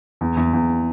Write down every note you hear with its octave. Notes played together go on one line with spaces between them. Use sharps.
E2
E2
E2